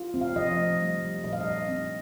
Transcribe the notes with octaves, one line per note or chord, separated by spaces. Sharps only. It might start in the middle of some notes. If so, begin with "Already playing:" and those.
Already playing: F4
C4
F5
F3 D#5
A3
G3
G3
A#2 D#5
F5
D#5
D4
C4